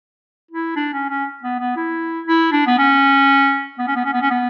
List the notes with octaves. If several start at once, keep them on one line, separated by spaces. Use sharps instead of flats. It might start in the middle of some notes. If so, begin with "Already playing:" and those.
E4
D4
C#4
C#4
B3
B3
E4
E4
D4
B3
C#4
B3
C#4
B3
C#4
B3
C#4
B3